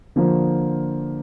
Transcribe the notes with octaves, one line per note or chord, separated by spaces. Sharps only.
D3 F3 A#3 F4 C5